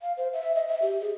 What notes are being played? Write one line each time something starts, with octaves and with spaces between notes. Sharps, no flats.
F5
C5
E5
D#5
E5
G4
G#4